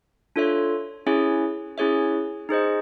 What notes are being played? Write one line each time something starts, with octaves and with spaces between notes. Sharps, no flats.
D4 F4 A4 C#5 E5
C#4 E4 G#4 C#5 E5
C#4 E4 G#4 C#5 E5
D#4 G#4 C5 D#5